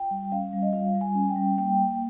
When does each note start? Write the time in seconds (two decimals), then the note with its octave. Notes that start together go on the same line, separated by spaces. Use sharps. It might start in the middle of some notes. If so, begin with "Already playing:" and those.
Already playing: F4 G5
0.11 G3
0.32 C#4 F5
0.53 G3
0.62 D#5
0.73 F4 F5
0.95 G3
1.01 G#5
1.15 C#4
1.29 G5
1.36 G3
1.57 A#3 G5
1.79 A#3